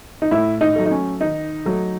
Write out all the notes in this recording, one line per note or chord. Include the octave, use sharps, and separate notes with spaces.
D#4
A2 E4
D#4
F#3 A3
D#4
C#4
D#3 D#4
F#3 A3